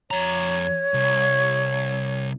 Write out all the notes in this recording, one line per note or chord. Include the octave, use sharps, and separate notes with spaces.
F2 C#5 A#5
C2